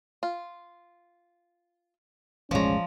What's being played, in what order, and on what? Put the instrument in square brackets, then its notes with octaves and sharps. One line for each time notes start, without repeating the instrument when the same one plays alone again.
[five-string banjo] F4
[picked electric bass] E1 A1 G#3 [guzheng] F3 A#5 [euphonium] C#4 [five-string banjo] C#5 D5